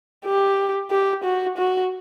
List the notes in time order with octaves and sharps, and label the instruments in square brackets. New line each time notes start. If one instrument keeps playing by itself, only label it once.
[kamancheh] G4
G4
F#4
F#4